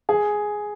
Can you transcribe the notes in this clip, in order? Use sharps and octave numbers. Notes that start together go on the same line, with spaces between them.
G#4